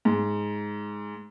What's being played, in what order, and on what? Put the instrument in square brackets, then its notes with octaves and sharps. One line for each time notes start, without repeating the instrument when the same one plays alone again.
[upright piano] G#2